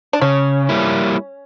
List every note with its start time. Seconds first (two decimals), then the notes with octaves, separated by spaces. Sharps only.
0.13 D4
0.21 C#3 C#4
0.69 G3 A#3 E4